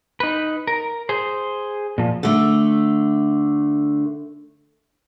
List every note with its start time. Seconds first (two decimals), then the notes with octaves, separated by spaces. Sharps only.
0.20 D#4 B4
0.67 A#4
1.09 G#4 C5
1.98 A#2 F3
2.23 D3 A3